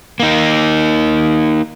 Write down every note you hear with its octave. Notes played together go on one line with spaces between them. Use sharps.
A#3 D#4